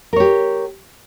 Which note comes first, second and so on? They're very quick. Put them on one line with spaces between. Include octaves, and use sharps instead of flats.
A#4 C#5 G4